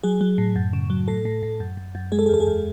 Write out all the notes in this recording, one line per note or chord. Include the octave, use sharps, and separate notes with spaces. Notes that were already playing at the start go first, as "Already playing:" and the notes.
F#3 G#4
F#3
A2
F#2
C#3
F#3
A2 A4
A2
A2
F#2
F#2
F#2
G#3 G#4
A4
G#4
E2 A4
G#4
E2